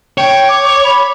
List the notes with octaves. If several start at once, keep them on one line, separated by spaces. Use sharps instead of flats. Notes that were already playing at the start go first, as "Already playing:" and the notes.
C#5 G5
D6
B5